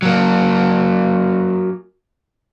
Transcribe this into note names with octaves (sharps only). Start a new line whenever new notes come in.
F#3 A#3